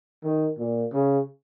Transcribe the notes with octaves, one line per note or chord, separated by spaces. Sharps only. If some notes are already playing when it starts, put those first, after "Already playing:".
D#3
A#2
C#3